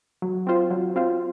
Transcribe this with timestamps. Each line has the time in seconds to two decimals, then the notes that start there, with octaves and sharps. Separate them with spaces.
0.22 F#3
0.47 C4 F4 C5
0.71 F#3
0.96 C4 F4 C5